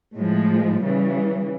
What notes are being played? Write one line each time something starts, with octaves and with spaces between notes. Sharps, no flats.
A2 F3 G#3
C#3 E3 G3